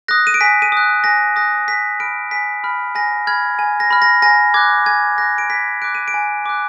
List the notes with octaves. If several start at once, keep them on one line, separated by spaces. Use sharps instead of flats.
D#6 F#6 A#6
D#7
D7
G#5 B6
D#7
D#6 F#6
G#5 A#6
D#6 F#6 A#6
G#5 B6
B5 F6 D7
G#5 B6
B5 F6
G#5 A#6
B5 F6 G#6
G#5
A#6
B5 F6
A#6
G#5 A#6
D6 F#6 G#6
G#5 G#6
D6 F#6 A#6
D7
G#5 B6
D6 F#6 D7
D#7
D7
G#5
D6 F#6